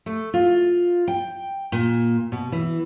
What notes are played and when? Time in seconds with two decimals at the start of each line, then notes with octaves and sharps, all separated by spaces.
0.06 A3
0.34 F4
1.08 G5
1.72 A#2
2.32 B2
2.52 E3